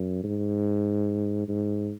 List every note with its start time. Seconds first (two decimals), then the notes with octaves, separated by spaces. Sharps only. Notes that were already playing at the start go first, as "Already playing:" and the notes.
Already playing: F#2
0.24 G#2
1.48 G#2